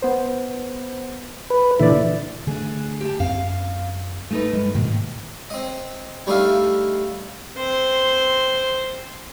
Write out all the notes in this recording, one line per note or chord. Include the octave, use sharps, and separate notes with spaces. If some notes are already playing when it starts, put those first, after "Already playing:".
B3 C5
B4
A#2 D3 E3 D5 E5
D3 A3 D4 G#4
G4 A5
F#2 C4 F5
A3 D#4 B4
G2 G#3
G#2 B2 D#3 A#3
C4 D#5
G3 A3 D4 D#4 E5 F5
C4 C5